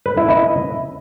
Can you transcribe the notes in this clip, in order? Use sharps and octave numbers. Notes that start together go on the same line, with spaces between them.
B4
E4
D#5